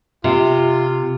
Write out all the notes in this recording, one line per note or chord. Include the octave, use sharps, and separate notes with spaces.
C3 F4